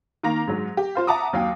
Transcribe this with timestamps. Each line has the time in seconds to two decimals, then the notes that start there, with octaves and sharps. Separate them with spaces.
0.23 D#3 A#3 A#5 A#6 F7
0.47 G#2 F#3 G#3
0.77 G4
0.95 F4 C5 F5
1.07 E5 F#5 A5 A#5 D6 D#6
1.33 D#2 F#3 F5 G5